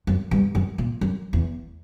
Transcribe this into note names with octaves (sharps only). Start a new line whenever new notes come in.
F#2
G2
F#2
A#2
F#2
E2